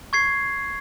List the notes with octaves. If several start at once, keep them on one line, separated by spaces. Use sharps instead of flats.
C#6 G#6 C7